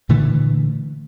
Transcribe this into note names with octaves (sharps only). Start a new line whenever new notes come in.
A#2 D3 E3 A3